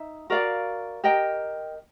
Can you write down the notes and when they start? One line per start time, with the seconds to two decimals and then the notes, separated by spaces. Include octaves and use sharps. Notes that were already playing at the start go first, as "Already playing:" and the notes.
Already playing: D#4 E5
0.30 F#4 A#4 D5 F5
1.04 G4 A#4 D#5 G5